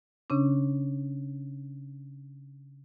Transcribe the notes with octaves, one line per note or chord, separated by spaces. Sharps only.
C#3 C#4 D4